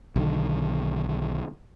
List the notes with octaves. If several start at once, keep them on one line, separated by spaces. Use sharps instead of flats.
B1 D3 D#3